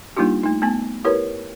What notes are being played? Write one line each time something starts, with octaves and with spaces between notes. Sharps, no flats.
G3 A#3 D4 D#4 F4 G4
A3 D#4
A3 B3 G#5
E4 G4 A#4 B4 C#5